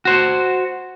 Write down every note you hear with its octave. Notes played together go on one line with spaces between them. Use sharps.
F#4 C5